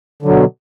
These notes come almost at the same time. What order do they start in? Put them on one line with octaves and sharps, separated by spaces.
D3 F#3 B2